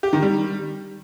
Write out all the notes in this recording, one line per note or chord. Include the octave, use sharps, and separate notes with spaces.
G4
D#3
G3